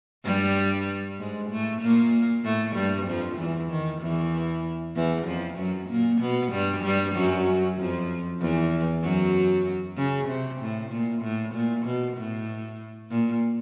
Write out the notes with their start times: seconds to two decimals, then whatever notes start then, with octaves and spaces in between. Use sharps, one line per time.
0.25 G2 G3
1.19 G#2 G#3
1.50 A2 A3
1.82 A#2 A#3
2.44 A2 A3
2.76 G2 G3
3.07 F2 F3
3.39 E2 E3
3.70 D#3
4.02 E2 E3
4.96 E2 E3
5.27 F2 F3
5.58 F#2 F#3
5.89 A#2 A#3
6.21 B2 B3
6.52 G2 G3
6.84 G2 G3
7.15 F#2 F#3
7.78 F2 F3
8.41 E2 E3
9.03 F#2 F#3
9.98 C#3
10.29 C3
10.61 A2
10.92 A#2
11.23 A2
11.54 A#2
11.86 B2
12.17 A2
13.11 A#2